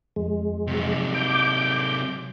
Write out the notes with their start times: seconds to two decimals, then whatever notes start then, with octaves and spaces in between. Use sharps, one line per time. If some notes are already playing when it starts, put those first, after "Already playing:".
0.16 F2 G#3
0.67 C3 F#3
1.15 D6 G6